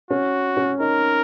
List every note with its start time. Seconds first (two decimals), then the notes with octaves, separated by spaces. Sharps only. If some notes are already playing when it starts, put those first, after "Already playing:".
0.10 C#4 F#4
0.57 C#4
0.80 D#4 A#4